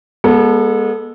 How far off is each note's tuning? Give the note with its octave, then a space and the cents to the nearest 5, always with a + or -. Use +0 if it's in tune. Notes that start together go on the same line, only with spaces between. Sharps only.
G#3 -15 B3 -40 A4 +0